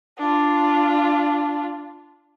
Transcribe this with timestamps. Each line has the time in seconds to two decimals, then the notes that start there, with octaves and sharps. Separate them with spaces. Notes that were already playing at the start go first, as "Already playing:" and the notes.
0.18 D4 F4